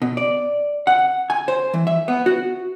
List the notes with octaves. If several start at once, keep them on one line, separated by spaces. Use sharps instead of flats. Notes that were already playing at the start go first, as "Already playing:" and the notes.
B2
D5
F#5
G#5
C5
E3
E5
B3
F#4